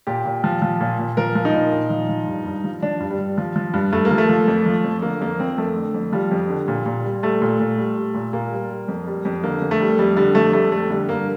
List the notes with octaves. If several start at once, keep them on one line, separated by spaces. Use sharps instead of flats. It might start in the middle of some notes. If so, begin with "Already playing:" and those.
A#2 G4
A#2
F3
F3
A#2
A#2
F3 A#4
F3
D#4
A#2
A#2
F3
F3
G2
G2
F3
F3 D4
G2
G3
G2
F3
F3
G2
G2 A3
A#3
F3
A3
F3
F2
F3
F2
D3 A#3
F2 A#3
F3 C4
F2 A3
D3
F2
F3 G3
F2
D3
A#2
A#2
G3
G3 A3
A#2
A#2
G3
G3
A#2
A#2 A#3
G3
G3
F2
G3
F2
D3 A#3
F2
A3
G3
F2 G3
D3 G3
F2 A3
G3 A3
F2 A3
D3 G3
G2 A#3